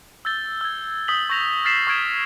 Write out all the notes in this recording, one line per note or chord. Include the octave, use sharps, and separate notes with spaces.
E6 G6 A6 G7
E6 G#6
D#6 G6 B6 F#7 G7
C#6 G6 A#6 F7
F6 A6 B6 C7 E7
C#6 D#6 F6 G#6 D7 E7